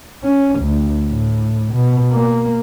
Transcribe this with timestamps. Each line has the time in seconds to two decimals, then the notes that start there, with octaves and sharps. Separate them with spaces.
0.23 C#4
0.60 D2
1.08 A2
1.74 B2
2.12 A#3